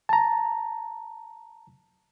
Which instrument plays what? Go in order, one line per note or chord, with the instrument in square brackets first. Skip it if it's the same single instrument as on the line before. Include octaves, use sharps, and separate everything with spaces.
[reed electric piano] A5 A#5